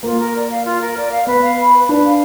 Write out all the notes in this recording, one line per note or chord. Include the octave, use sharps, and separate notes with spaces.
A#3 F4
A#4
D5
F5
F4
A#4
D5
F5
B3 B4
F5
B5
B4
D4 B4
F5